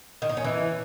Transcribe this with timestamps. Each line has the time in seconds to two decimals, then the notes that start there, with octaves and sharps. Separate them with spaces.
0.22 D#3
0.29 D#4
0.37 C#4
0.44 E3